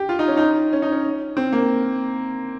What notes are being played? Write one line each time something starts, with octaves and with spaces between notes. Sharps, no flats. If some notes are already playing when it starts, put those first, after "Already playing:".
Already playing: G4
F4
D#4
C#4
D#4
C#4
D#4
C#4
C4
A#3